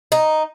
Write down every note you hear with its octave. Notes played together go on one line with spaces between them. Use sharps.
D#4